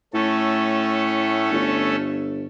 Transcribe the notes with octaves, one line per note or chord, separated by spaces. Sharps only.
A2 A3 C#4 A4
G1